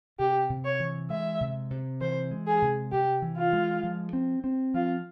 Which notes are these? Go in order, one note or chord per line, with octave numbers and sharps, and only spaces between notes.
C3 G4
C3
C#5
E3
G#3 E5
C3
C3
E3 C5
G#3
G#4
C3
C3 G4
E3
F4
G#3
F3
C4
C4
F3 F4